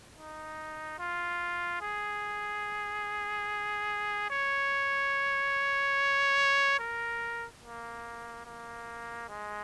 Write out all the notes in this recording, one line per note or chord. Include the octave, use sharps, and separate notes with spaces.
D#4
F4
G#4
C#5
A#4
A#3
A#3
G#3